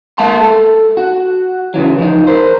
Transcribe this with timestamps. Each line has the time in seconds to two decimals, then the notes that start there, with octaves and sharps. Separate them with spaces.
0.18 G#3 A#3 E5 A5 C6
0.41 A4
0.97 F#4
1.74 C#3 E3 F#3
1.98 F3 D#4
2.27 A#4 C5